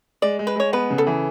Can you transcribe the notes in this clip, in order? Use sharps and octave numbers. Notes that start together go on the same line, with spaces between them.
G#3 D5
G#3
B4
G#3 C#5
B3 B4
C#3
A4
E3